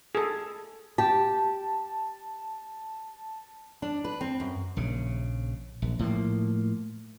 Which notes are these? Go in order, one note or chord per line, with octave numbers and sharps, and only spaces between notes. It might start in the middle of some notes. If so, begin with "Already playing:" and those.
G#4 A4
G4 A5
D4
B4
C4
F#2
A#1 C#3
A#1
A2 F3 F#3 A#3